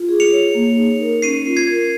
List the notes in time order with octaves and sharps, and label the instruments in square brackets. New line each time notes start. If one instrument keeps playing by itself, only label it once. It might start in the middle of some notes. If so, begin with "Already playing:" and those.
Already playing: [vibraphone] F4
G#4
[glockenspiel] C#7 F7
[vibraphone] C#5
A#3
D#4
A#4
[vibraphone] C#4 [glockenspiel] C7 D#7
[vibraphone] F4
[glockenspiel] G#6 C7
[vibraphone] A#4